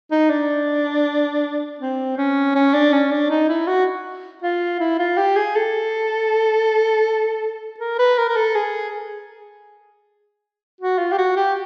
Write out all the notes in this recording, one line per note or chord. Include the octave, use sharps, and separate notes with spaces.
D#4
D4
C4
C#4
C#4
D4
C#4
D4
D#4
E4
F#4
F4
E4
F4
G4
G#4
A4
A#4
B4
A#4
A#4
A4
G#4
F#4
F4
G4
F#4
G4